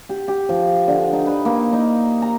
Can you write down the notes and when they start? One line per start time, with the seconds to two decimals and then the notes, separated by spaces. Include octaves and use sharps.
0.09 G4
0.28 G4
0.49 F3
0.88 D3
1.13 D#4
1.26 B4
1.45 A#3
1.73 D#4
2.22 A#5